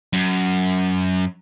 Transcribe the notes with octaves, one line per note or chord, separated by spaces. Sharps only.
F#2